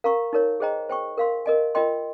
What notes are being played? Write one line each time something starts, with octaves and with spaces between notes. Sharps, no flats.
A#4 F5 A#5 C#6
D#4 A#4 C#5
G#4 C5 D#5 G5 A#5
C5 G5 C#6
A#4 F5 C6
A#4 D#5 G#5
F4 A#4 D#5 G5 C6